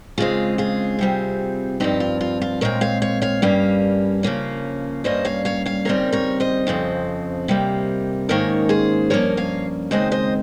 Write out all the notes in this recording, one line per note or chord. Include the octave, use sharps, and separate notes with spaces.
C#3 G#3 C4 F4 G#4
F4 G#4
C3 G3 C4
G2 F3 C4 D#4 G4
F4
F4
F4
A#2 G#3 C4 A#4 C#5
C#5 F5
C#5 F5
C#5 F5
G2 G3 A#3 C#4
C#3 F3 A#3 C#4
G2 G3 A#3 C#4 C5 D#5
C#5 F5
C#5 F5
C#5 F5
D#2 C#3 G3 C4 A#4 C#5
A#4 C#5
C5 D#5
F2 C#3 F3 C4
C3 G3 A#3
G#2 D#3 A#3 C#4 A#4 C#5
G#4 C5
G2 F3 A#3 C#4 A#4 C#5
C#5 F5
D#2 C#3 G#3 C4 C5 D#5
C5 D#5